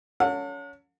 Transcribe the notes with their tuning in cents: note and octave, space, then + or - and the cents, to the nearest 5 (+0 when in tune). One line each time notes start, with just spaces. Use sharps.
C#4 +25 A4 +40 F#5 -45